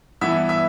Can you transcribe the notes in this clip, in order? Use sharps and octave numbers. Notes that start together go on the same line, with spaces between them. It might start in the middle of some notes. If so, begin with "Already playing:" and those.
G2 E3 B3 E4 E5
E5